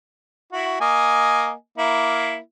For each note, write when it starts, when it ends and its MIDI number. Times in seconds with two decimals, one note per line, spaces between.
0.53 0.79 64
0.53 0.79 66
0.81 1.53 58
0.81 1.53 75
0.81 1.53 80
1.78 2.38 58
1.78 2.38 64